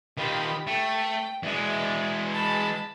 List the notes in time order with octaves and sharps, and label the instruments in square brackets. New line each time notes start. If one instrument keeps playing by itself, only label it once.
[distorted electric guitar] D#3 F4 [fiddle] G4 B5
[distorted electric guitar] A3 [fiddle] G5
[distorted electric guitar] E3 G#3 [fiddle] D5 E5
[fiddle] A5 B5